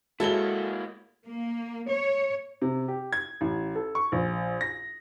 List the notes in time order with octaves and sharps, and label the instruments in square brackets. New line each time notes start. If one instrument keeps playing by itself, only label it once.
[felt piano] G#3 [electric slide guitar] A#3 E4 [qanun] F#4 C#5 D#5 [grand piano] A4 G7
[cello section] A#3
C#5
[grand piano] C3
G4
G#6
A1
A4
C#6
A#1
A#6